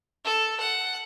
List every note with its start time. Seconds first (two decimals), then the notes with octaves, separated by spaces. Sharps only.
0.25 A4
0.60 F#5